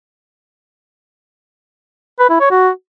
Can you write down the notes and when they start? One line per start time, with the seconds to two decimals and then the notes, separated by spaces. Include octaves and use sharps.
2.19 B4
2.30 E4
2.40 C#5
2.51 F#4